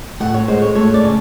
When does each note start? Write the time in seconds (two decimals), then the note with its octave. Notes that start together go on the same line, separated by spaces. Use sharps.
0.20 A2 F#5
0.34 C#5
0.48 G#3 C5
0.62 C#5
0.75 A3 C#5
0.94 D5
1.03 C#3